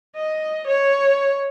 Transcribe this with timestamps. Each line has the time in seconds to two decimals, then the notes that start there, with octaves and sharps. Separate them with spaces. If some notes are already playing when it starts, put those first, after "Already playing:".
0.16 D#5
0.67 C#5